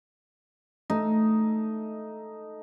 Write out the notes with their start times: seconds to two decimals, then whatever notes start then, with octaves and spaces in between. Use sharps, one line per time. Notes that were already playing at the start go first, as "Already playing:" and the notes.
0.90 A3 D#4